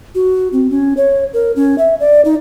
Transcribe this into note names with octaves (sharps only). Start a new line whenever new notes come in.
F#4
C4
C#4
C#5
A#4
C#4
E5
D5
D#4